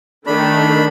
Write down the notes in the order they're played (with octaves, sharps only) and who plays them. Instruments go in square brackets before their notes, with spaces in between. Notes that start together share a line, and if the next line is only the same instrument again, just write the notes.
[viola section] D#3 A3 [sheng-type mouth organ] D4 B5